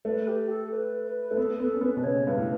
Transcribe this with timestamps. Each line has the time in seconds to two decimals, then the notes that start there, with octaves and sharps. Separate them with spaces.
0.05 A3 B4
0.28 G4
0.50 A4
0.71 B4
1.04 B4
1.31 A3
1.37 B3 A4
1.59 B3 A4
1.74 C#4
1.81 B3 B4
1.97 B2
2.03 C#3 C#5
2.26 G2 B4
2.37 A2